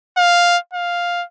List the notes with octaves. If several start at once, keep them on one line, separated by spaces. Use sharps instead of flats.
F5
F5